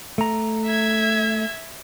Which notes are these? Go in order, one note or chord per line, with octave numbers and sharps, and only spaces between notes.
A3 A#5
E5 G#6